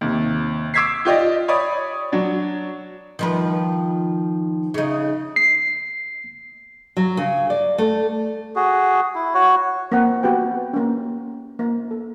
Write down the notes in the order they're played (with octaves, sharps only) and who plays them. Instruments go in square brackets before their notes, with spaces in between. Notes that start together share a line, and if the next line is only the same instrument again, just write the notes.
[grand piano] D#2 C3
D6 E6 G#6 B6 C7
F4 G4 D5 D#5
C#5 D5 B5 D#6
F#3 D4
[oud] D#3 F3 B4
C#3 D#4
[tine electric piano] C7
[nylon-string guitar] F#3
C#3
D5
A3
[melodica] F#4 G#4
E4
F#4 C#5
[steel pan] A#3 C4 F#5
B3 F#4 G4 B4 G5
A#3 C#4
A#3
A4